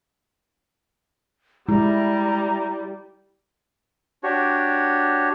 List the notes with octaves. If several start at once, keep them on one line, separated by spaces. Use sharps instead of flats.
G3 G#3 E4 A#5
D4 F#4 G4 C#5